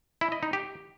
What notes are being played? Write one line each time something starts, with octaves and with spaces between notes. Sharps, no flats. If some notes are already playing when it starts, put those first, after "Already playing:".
E4
D#5
D#4
G4